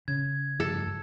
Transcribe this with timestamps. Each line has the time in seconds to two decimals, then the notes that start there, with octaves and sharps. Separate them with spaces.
0.08 C#3 G#6
0.60 G2 F3 A4